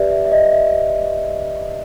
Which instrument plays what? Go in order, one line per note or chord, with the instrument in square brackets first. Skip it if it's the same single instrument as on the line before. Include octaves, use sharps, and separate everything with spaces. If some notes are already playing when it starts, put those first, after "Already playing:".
Already playing: [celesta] G4 B4 D5 E5
E5
E5
D#5
E5